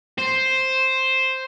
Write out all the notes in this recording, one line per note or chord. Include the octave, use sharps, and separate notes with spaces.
C5